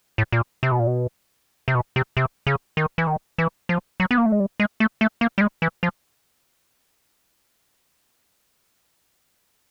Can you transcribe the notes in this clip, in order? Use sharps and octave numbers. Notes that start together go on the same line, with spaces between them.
A2
A#2
C3
B2
A#2
B2
C3
B2
C3
C3
C#3
D#3
E3
D#3
E3
F3
F#3
B3
A#3
A3
G#3
G3
G#3
A3
A3
A#3
G3
G#3
E3
F3